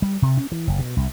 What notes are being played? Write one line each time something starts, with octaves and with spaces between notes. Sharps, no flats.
G3
C3
C#4
E3
F#1
B2
C2